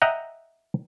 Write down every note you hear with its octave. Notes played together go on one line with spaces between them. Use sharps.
D#5 E5 F#5 G5 A#5